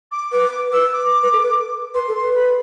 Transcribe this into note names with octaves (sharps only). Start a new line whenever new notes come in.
D6
B4 D6
B4 E6
D6
B4
A4
B4
B4 C6
A4
C6
B4
B5